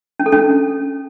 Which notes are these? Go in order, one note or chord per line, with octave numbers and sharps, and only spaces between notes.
C#4
A4
C#4